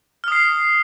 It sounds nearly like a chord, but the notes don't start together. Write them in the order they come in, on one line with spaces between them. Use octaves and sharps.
F6 D#6 C7